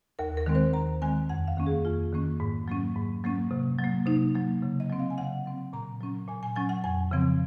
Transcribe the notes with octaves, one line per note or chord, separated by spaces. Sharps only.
D#2 A#4
A#4
D#3 G#3 C4
C5
D#2 A#5
D#3 G#3 C4 G#5
F2 F#5
F5
D#3 A#3 C#4
G#4
F2 F4
D#3 A#3 C#4
G#2
F#3 A#3 C#4
G#2
F#3 A#3 C#4
C3
F#3
A#3
C3 D#4
F#3 A#3
C#3
D#5
F#3 C4
F5
G#5
C#3 F#5
F#3 C4
A#2 A#5
F#3 C#4
A#2 G#5
G#5
F#3 C#4 G#5
F#5
F2 G#5
C#3 F3 C4